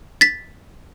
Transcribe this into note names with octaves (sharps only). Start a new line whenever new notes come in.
A6 B6